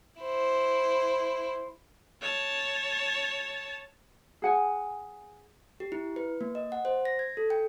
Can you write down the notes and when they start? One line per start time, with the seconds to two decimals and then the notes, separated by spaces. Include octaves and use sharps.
0.21 E4 C5
2.21 C#5 A5
4.42 G#4 F#5 G#5
5.80 G4
5.92 E4
6.16 B4
6.41 A#3
6.55 D#5
6.72 F#5
6.85 C5
7.05 A#6
7.19 G#6
7.37 A4
7.50 G5